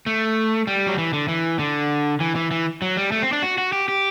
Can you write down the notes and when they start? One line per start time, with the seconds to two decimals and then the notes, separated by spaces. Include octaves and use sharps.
0.06 A3
0.67 G3
0.87 F#3
0.98 E3
1.13 D3
1.28 E3
1.59 D3
2.20 E3
2.36 E3
2.51 E3
2.82 F#3
2.97 G3
3.12 A3
3.22 C4
3.32 D4
3.42 F#4
3.58 F#4
3.73 G4
3.88 G4